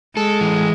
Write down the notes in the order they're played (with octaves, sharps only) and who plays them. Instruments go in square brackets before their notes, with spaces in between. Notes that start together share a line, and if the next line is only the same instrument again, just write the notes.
[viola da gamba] G#3 [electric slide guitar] A4
[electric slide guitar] E3